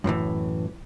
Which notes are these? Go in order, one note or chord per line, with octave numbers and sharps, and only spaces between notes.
F#2 A2 D#3 E3